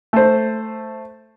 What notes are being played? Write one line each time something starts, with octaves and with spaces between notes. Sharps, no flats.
A3 C5